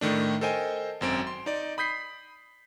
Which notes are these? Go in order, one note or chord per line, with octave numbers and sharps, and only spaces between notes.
A2 D#3 A3 D4
A4 A#4 C5 D#5 G5 G#5
G#1 F#2 C4 D7
C6
D#4 D5
B5 D#6 G6 B6 C7